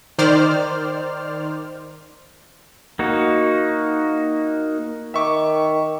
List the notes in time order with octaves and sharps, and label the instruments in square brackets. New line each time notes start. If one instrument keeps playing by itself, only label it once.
[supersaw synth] D#3 C5 D5 F6
[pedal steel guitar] A#3 D#4 F#4
[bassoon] D#3 [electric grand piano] E5 C#6 D6